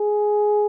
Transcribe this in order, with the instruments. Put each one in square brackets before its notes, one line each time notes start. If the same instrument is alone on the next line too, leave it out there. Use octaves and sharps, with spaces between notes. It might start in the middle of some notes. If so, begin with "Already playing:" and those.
Already playing: [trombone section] G#4